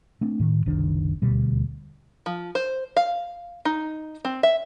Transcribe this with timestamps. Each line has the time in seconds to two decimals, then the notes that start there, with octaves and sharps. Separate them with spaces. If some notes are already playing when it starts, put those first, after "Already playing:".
0.21 A3 C4 D4
0.40 A2 D#3
0.66 F#1 C2 D#3 D4
1.22 D#1 D2 B2 G3
2.26 F3
2.55 C5
2.97 F5
3.65 D#4
4.25 C4
4.43 E5